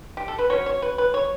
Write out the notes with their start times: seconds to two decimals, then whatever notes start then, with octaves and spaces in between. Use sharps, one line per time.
0.17 G4
0.28 A4
0.39 B4
0.50 F#3 C#4 C#5
0.66 C#5
0.82 B4
0.98 B4
1.14 C#5